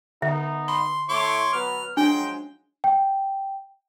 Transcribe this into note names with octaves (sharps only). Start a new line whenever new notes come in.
D3 B3 D#4 E5
B5 C6
A3 E4 C#5 C6 D6
F#3 B3 B4 F6
F3 F#3 G#3 D4 G5
G5